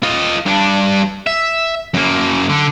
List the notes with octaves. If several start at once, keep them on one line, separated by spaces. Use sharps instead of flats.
F4 D#5
G2 D4
E5
F#2 A#3
D3